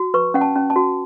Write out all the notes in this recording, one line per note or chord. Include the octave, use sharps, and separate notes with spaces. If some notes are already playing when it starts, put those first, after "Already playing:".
Already playing: F#4
B4 C#6
C#4 F#5
A5
C#4
A5
F#4